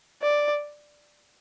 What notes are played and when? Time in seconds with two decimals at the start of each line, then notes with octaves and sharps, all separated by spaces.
0.22 D5